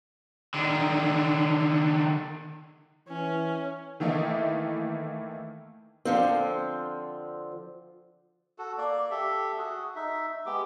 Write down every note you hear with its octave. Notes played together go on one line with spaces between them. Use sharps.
D3 D#3
E3 C#4
D#3 E3 A3 A#3 E4 D#5
D3 F3 C4
F#4 A4
A#3 D5
G4 A4 E5
F#4 G#4
D#4 E5
G#3 B3 G4 D6